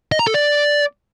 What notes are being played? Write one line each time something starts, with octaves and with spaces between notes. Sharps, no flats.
D#5
A#5
A4
D5